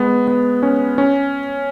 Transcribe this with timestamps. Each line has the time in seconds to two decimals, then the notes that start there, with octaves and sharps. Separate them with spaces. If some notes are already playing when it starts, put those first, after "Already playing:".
Already playing: G#3 B3
0.28 B3
0.63 C#4
0.98 C#4